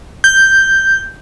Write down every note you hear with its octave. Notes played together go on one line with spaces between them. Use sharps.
G6